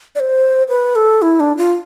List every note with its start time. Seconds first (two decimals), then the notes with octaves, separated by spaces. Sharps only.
0.15 D5
0.20 C5
0.69 B4
0.96 A4
1.22 E4
1.40 D4
1.57 F4